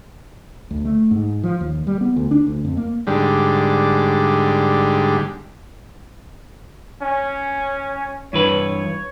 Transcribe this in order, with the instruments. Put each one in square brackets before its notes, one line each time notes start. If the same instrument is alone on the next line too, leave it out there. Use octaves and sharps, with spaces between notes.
[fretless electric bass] D2
A3
G#2
F3
D#2
G3
B3
D2
D4
D2
F2
A#3
[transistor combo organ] G#2 D3 G3
[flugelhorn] C#4
[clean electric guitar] G2 E3 B4 [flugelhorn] C#5